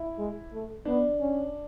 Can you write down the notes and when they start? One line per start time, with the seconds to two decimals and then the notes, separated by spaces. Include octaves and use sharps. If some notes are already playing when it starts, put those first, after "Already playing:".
Already playing: E4
0.18 G#3
0.53 A3
0.85 B3 D4
1.20 C#4